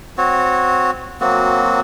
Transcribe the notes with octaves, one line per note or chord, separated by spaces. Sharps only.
C4 F#4 C#5
F#3 A#3 C4 F#4